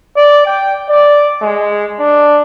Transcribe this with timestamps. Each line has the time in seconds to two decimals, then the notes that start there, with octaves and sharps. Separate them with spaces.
0.16 D5
0.46 G5
0.89 D5
1.42 G#3
2.00 D4